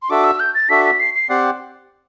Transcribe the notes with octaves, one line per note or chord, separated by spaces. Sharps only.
C6
D4 F#4 A4 E5 D6
E6
G6
A6
D4 F#4 A4 E5 B6
B6
C7
C7
C4 G4 D5 F#5